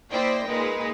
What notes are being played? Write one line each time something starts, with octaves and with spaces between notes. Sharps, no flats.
A#3 E4 C5 D5 D#5 G5
A#2 G#3 D#4 B4